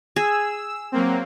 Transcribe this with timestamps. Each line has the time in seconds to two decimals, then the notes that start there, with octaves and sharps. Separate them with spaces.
0.16 G#4 E6
0.92 F#3 A#3 C4